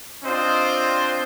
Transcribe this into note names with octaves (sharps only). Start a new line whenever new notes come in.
C4 D4 F4 C5 D#5